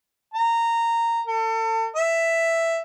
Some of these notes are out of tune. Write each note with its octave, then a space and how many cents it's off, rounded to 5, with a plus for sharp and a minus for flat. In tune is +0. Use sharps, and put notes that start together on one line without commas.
A#5 -15
A4 +35
E5 +5